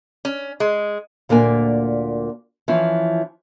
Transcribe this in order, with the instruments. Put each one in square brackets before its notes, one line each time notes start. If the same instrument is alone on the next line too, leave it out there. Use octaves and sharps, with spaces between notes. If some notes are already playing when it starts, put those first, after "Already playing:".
[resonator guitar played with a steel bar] C#4
G#3
[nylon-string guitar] D2 A#2 A#3 D4 G#5
E3 F3 C#4